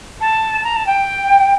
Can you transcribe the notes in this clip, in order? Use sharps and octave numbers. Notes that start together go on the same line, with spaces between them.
A5
A#5
A5
G5